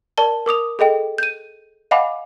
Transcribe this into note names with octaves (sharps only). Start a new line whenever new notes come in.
A#4 D5 A5 G7
A#4 D6 D#6 F7
G#4 A4 D#5 G5
G6 D#7
D#5 F5 F#5 G#5 B5 D6